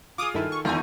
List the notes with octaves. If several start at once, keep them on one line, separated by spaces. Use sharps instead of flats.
F4 G#4 D6 D#6
G2 D#3 E4 A4 A#4
C#6
E2 D3 D#3 A3 D#4 F4 G#5